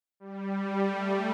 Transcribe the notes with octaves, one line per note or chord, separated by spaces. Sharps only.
G3
A3